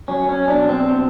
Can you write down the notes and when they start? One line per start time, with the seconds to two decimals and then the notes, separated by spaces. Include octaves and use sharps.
0.08 F#3 C#4
0.29 C#4
0.48 B2 D4
0.69 C4
0.89 B2